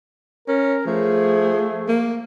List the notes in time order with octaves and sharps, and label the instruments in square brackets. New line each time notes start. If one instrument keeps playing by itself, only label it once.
[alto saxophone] C#4 [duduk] A#4
[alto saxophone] F3 [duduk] A3 [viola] G#4
[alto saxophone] A#3